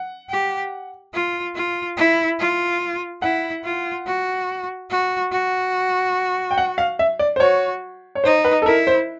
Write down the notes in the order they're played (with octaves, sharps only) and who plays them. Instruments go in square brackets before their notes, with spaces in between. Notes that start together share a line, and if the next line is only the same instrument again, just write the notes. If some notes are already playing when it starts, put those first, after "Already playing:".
Already playing: [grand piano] F#5
[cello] G4
F4
F4
E4
F4
[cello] E4 [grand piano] F#5
[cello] F4
F#4
F#4
F#4
[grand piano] G5
F#5
F5
E5
D5
C5
[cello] F#4 [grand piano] C#5
[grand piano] C#5
[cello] D#4 [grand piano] C5
[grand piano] B4
A4
[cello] E4 [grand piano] A#4
[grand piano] C5